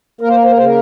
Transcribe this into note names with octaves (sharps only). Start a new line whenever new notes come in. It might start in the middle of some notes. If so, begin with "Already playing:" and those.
A#3 A#4
C5
A#4
C5
A#4
C#3 C5
A#4